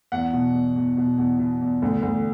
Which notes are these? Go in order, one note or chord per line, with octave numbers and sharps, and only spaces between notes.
E2 F#5
B2
E2
E2
B2
E2
B2
E2
D2
D2